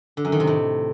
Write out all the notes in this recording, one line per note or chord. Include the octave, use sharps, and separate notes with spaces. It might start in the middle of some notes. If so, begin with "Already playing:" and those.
D3
F#2
D#3
C3
A2